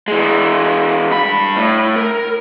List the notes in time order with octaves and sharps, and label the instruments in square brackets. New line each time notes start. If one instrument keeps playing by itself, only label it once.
[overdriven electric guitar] E3 G#3
G2 B5
A2
A#4